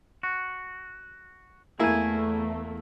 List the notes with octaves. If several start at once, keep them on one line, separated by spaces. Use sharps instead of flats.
F#4
E2 A3 A#3 E4 G#4 G#5